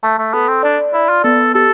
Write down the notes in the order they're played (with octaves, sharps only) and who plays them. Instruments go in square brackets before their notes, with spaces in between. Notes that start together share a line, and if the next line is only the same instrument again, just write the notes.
[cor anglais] A3 [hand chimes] A5
[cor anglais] A3
[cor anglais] B3 [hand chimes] A4
[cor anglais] C4
[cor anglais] D4 [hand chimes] D5
[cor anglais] E4 [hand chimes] D5
[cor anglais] F4
[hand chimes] B3 [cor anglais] A4
[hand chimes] G4 [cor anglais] A4